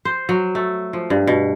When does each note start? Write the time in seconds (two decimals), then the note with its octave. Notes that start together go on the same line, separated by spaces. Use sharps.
0.05 C5
0.29 F#3
0.55 A3
0.93 F3
1.10 G2
1.27 B2